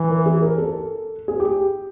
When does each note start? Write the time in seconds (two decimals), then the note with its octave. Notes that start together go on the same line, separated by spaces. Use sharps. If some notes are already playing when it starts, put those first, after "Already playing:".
Already playing: E3
0.10 A#4
0.26 G#4
0.42 A#4
0.58 A4
1.28 G#4
1.40 G4